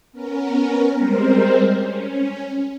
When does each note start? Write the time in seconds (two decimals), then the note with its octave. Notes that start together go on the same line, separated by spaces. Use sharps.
0.13 B3 C#4 A#4
0.95 G3 G#3 C4 A#4 C5
1.76 C#4